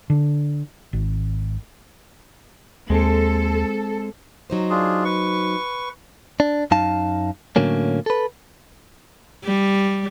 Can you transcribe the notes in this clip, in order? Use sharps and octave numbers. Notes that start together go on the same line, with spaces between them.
D3
G#1
D#2 G#3 C4 A4
F#3 D#4 C5
D4 F4 G#4
B4 C#6
D4
F#2 D#4 F5 A5
A2 D3 F#3 A#3 C#4
A4 B4
G3